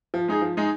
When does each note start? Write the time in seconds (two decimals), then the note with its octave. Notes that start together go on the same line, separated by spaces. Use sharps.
0.14 F3
0.28 G#3 D#4 G#4
0.42 F3
0.57 G#3 D#4 G#4